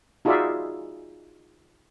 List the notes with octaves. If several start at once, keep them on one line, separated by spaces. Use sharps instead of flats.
D#4 F4 F#4 G#4 D5 E5